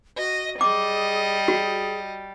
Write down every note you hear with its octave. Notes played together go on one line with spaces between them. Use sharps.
F#4 D#5
G3 G#4 D#5 D6
F#4 G#4